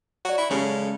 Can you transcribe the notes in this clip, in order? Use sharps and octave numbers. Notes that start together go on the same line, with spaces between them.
F#4 C5 D5
E4
C#3 G#3 C#4 G4 A4 B5